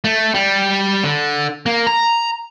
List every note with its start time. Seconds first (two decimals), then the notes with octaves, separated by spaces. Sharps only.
0.04 A3
0.34 G3
1.04 D3
1.66 A#3
1.87 A#5